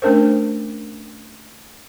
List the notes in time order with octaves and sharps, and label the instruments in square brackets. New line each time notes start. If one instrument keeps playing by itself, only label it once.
[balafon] A3 C#4 D4 A#4 C5